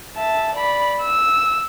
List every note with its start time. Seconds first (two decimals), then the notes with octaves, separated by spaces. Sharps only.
0.17 E5 A5
0.56 D5 B5
1.03 E6